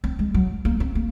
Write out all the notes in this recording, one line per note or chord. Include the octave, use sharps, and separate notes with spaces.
C4
G#3
F#3
A#3
C4
A#3